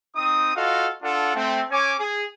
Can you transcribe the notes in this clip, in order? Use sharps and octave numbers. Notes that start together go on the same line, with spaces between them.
C4 D#4 D#6
F4 F#4 A4 D#5 F5
D4 F4 A4 F#5
A3 C4
C#4 C#5 G#5 D6
G#4